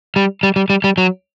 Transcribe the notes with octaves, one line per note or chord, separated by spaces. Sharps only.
G3
G3
G3
G3
G3
F#3